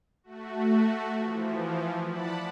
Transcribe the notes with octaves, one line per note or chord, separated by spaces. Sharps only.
A3 F#4
E3 F3
D5 F#5 A5 B5